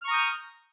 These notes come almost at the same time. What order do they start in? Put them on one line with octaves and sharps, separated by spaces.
F6 C#6 A#5 D#6 G6